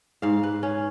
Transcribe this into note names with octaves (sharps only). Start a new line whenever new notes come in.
G#2 F5
B4
C#4